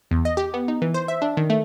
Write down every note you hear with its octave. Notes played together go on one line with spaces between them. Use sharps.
E2
D#5
G4
B3
D#4
E3
C5
E5
D4
D#3
A3